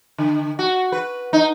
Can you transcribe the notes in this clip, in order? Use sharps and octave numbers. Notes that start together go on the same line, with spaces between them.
D3
F#4
B4
D#4